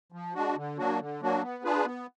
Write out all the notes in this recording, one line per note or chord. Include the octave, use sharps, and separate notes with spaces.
F3
G#3 D4 F#4
D3
F#3 A#3 D4 F#4
D3
F#3 A#3 D4 F#4
B3
D4 F4 G#4 B4
B3